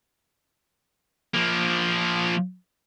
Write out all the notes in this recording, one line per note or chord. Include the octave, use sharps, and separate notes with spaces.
F3 A#3